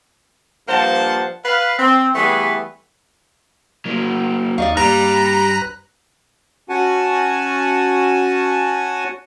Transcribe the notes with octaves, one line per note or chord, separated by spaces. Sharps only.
G2 F3 A#3 C5 F#5 A5
B4 F5
C4
E3 G3 A3 B3 G#4 B4
F#3 A#3
D#2 D#4 D5 D#5 F5 C#6
G2 G3 A#3 B4 A#5 F#6
C#4 F#4 F#5 G#5 A5